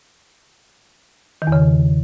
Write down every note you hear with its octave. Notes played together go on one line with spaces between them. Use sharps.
D#3
E2
C#3